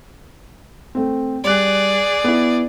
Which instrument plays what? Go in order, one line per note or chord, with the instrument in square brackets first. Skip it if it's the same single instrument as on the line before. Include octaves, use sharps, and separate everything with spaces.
[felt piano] A3 C4
[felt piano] G3 F#6 [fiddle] G#4 D5
[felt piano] B3 E4